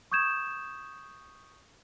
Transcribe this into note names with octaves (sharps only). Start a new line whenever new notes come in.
C#6 D#6 G6 G#6 E7